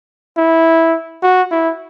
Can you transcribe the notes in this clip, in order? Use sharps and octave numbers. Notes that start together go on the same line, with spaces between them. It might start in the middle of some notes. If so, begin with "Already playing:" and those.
E4
F#4
E4